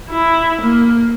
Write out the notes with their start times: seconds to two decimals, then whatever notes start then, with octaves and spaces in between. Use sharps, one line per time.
0.10 E4
0.61 A#3